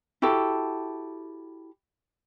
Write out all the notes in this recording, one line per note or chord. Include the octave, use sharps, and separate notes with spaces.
E4 F#4 G4 A4